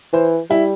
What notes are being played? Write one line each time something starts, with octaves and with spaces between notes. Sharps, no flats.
E3 C5
G3 E4